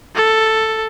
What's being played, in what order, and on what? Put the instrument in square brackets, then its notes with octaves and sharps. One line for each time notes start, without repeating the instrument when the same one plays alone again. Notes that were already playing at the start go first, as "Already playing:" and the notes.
[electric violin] A4